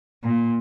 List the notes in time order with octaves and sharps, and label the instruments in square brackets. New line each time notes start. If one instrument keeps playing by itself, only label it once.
[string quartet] A#2